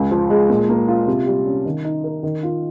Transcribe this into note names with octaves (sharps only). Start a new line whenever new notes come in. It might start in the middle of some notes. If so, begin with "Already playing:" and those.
Already playing: C#2
F3
G#3
A#2
A#3
F4
C3
G3
C#4
D#3
D#4
A#4
D#3
F4